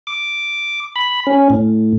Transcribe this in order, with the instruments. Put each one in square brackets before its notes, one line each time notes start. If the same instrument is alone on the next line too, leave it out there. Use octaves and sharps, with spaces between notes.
[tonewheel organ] D6
B5
C#4
A2